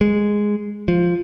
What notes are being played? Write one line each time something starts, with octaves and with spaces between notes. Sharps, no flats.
G#3
F3